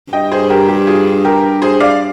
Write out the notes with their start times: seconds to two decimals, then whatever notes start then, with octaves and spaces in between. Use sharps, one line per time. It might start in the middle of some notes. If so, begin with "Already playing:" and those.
0.13 G2 D#5 G5
0.32 G#4 C5
0.50 G4 A#4
0.68 G4
0.87 F4 G#4
1.25 G4 A#4
1.62 G#4 C5
1.80 D5 F5